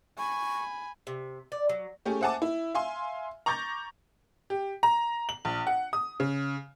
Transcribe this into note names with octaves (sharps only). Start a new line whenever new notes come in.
G#5 B5 C#6
C3
D5
F#3
A3 C#4 G4 G#4
C5 E5 F#5 G#5 A5 D6
E4
E5 F5 G#5 C6
A#5 C#6 D6 G6 A6 A#6
G4
A#5
F#7
A#1
F#5
D#6
C#3